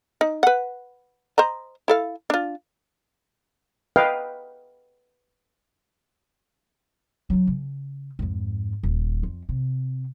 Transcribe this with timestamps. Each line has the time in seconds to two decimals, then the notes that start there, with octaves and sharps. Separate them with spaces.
0.21 D#4
0.43 B4 F#5
1.38 C5 D#5 A#5
1.88 E4 A4 F5
2.30 D4 F4
3.96 B4 D#5 F5 G5
7.30 F#3 D4
7.47 C#3
8.19 F2 G#2
8.83 D#1
9.23 F2
9.49 C3